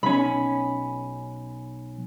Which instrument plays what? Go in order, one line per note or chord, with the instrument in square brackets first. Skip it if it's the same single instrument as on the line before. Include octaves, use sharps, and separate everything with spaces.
[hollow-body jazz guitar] B1 C#4 [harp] B5